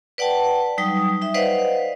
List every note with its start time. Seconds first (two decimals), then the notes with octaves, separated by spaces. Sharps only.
0.18 B4 D5 F#5 G5 A5
0.78 F#3 G3 D#4 G5 D#6
1.22 D#4 E5
1.34 B4 C5 D5 D#5 F5 F#5